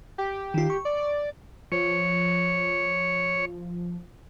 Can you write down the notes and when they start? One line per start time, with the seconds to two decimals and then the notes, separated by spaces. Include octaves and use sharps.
0.18 G4
0.54 D#3 F4
0.70 C#6
0.85 D5
1.72 F3 C#5